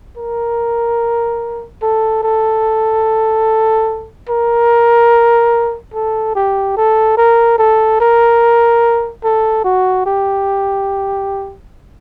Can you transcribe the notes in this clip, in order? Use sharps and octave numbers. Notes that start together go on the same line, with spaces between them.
A#4
A4
A4
A#4
A4
G4
A4
A#4
A4
A#4
A4
F#4
G4